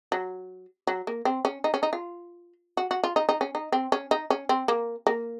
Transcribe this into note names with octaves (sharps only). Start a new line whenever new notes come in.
F#3
F#3
A#3
C4
C#4
D#4
C#4
D#4
F4
F#4
F#4
F4
D#4
D#4
C#4
D#4
C4
C#4
D#4
C#4
C4
A#3
A#3